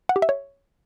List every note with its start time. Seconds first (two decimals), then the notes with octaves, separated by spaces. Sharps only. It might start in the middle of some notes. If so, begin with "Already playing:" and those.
0.09 F#5
0.16 G4
0.22 E5
0.29 C#5